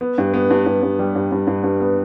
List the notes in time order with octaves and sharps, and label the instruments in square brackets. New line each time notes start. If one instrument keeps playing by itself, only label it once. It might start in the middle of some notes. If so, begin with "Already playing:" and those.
[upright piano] B3
G2
B3
G2
G2
G2
G3
G2
G2
G2
G2
B3